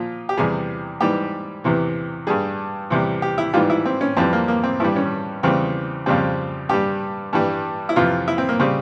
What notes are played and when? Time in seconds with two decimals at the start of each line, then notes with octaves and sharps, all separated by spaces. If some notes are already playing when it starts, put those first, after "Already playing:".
Already playing: A#2 F3 F4
0.29 G4
0.37 E2 C3 G3 G#4
1.00 G#2 E3 G3 G4
1.64 E2 C3 E3
2.27 G2 G3 G#4
2.90 E2 C3 G3
3.22 G4
3.38 E4
3.53 G#2 E3 G3 F4
3.70 E4
3.85 C4
4.01 C#4
4.17 F2 E3 G3 C4
4.33 A#3
4.48 A#3
4.64 C4
4.80 G2 E3 G3 E4
4.96 C#4
5.43 E2 C#3 G3 C4
6.06 F2 C#3 G3 C4
6.69 G2 G3 G4
7.33 G2 E3 G3
7.89 E4
7.96 F2 C3 E3 F4
8.28 E4
8.38 C4
8.49 A#3
8.59 C#3 G3 C4